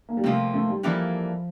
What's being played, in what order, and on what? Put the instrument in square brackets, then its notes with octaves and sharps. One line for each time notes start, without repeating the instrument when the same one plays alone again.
[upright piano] A#3
G3
[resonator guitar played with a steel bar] C3 F3 A#3 F4 [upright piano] A3
[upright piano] A3
G3
[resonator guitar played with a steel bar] E3 G3 A#3 E4 A4 [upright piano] F3